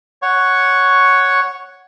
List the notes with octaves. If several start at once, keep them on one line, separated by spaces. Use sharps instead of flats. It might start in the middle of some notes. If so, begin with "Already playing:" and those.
C#5 F#5 C#6